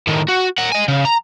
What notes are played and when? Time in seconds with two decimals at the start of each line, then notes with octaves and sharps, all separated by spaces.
0.07 A2 D#3
0.28 F#4
0.58 A#4 F#5
0.72 D#5 G#5
0.88 C#3
1.05 A#5